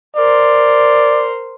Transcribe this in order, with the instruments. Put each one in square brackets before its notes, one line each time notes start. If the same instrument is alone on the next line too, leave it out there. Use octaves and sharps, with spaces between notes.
[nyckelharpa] A#4 C5 [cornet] D5